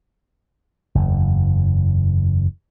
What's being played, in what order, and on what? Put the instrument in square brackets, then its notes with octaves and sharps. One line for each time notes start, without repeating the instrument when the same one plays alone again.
[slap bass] F#1 E2